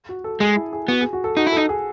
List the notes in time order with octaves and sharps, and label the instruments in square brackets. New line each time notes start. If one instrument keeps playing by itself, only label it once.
[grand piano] F#4
A4
[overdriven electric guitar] G#3 [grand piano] G#4
[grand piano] E4
G#4
[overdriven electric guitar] B3 [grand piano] F#4
[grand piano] G#4
F#4
A4
[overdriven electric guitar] D#4 [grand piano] F#4
[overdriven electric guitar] E4
[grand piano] A4
[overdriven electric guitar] D#4
[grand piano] G#4